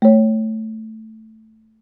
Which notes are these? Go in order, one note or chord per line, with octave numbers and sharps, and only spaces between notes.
A3 C#5